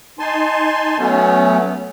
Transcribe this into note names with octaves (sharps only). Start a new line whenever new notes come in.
D#4 G#5 A5 C6
F#3 A3 B3 C#4